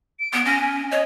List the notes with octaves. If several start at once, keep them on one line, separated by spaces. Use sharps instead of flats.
D7
B3
C#4 A#6
G#5
C#5 D#5